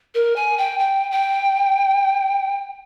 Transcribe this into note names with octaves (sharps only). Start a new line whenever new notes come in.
A#4
G#5
G5
G5
G5